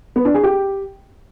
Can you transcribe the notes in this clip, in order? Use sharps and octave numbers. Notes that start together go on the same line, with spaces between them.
B3
D4
G#4
G4